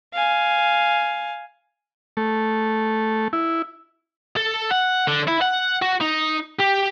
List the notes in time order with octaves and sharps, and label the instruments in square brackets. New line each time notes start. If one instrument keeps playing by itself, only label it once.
[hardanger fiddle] F5 G#5
[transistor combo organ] A3
E4
[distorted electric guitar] A4
F#5
D3
E4
F#5
F#4
D#4
G4